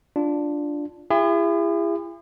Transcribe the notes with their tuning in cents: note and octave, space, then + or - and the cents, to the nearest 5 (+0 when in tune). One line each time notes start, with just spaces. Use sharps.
D4 +0 F4 +0
E4 +35 G#4 -45